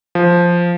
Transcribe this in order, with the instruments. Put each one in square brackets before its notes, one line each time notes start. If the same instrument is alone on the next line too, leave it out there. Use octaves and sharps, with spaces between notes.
[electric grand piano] F3